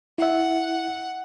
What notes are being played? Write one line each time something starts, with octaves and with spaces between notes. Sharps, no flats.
E4 E5 F#5